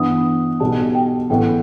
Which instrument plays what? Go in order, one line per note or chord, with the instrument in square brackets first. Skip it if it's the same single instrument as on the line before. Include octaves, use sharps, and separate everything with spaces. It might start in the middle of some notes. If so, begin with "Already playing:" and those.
Already playing: [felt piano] G2 E3 B3 [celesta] D#6
[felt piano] B1 B2 G3 [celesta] A5
[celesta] G5
[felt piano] A1 A2 E3 B3 [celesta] G5